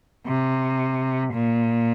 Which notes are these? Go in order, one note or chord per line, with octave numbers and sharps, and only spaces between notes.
C3
A#2